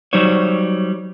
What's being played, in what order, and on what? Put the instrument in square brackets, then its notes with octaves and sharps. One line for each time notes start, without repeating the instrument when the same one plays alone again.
[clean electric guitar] F#3 G3 D#4 C5 C#5